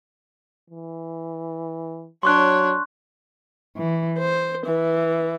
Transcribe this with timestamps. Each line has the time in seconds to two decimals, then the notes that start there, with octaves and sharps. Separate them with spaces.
0.70 E3
2.23 F#3 D4 C#5 C6 C#6 F#6
3.77 E3
4.19 C5
4.66 E3